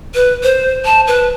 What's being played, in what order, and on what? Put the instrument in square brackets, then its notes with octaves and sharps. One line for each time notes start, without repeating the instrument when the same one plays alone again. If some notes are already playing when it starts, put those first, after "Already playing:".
[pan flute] B4
C5
A5
B4